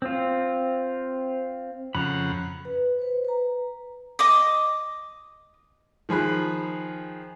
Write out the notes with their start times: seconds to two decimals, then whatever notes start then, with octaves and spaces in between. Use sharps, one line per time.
0.02 C4 F4
1.95 F2 C#3 F#5 A#5 B5
2.65 B4
2.99 B4 C5
3.25 B4 A#5
4.19 D#5 D6 D#6
6.09 D#3 F3 G#4 B5 F#6